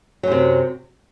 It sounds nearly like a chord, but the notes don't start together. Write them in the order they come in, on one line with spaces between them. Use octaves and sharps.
F#3 F#2 C3